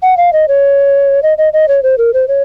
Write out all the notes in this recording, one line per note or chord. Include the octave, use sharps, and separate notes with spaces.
F#5
F5
D#5
C#5
D#5
D#5
D#5
C#5
C5
A#4
C5
C#5